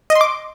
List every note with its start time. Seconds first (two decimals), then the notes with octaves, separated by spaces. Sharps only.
0.10 D#5
0.15 C6
0.21 D6